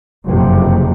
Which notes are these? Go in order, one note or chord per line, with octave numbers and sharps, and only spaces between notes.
F#1 F2 C3